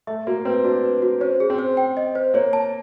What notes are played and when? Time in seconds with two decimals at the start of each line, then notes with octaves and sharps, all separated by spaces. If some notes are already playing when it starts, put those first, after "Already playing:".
0.07 A3 E5
0.27 A#3 F#4
0.45 C4 B4
0.64 D4 F#4
0.83 B4
1.02 F#4
1.20 C#4 C5
1.40 G#4
1.50 C4
1.59 C5
1.77 G5
1.97 D#5
2.15 C5
2.34 A#3 C#5
2.53 A5